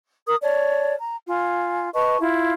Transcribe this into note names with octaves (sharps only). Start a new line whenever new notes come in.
A#4 D#6
C#5 D5 A5
A#5
F4 G#5
B4 D#5 A5 C#6
E4 F4